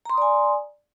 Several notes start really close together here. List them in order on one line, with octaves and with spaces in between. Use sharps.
A#5 C6 D#6 D5 G#5